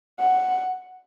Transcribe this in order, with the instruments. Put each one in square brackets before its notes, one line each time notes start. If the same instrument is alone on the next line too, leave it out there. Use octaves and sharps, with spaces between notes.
[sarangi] F#5